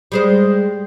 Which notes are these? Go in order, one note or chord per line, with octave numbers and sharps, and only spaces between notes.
G3 G#3 C5